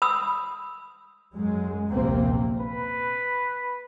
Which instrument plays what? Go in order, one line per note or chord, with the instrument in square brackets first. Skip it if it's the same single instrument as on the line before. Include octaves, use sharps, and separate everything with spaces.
[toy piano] B5 D#6 E6
[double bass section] F#2 G#3
A#1 D#2 C3 A#3 C4
[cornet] B4